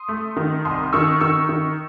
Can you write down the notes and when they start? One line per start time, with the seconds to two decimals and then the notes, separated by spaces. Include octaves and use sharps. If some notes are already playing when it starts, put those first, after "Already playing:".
Already playing: C6 D#6
0.09 A3
0.37 D#3
0.65 C2 C6 D#6
0.93 D#3 C#6 E6
1.21 D#3 C#6 E6
1.49 D#3